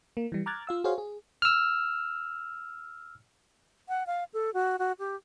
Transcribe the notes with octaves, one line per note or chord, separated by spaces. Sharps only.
A#3
E3 G3
A#5 D6 F6 F#6 G#6 A6
F4 F5 E6
F#4 G#4 C5 C#5 F5
G#4
E6 F6
F#5
F5
A4
F#4
F#4
G4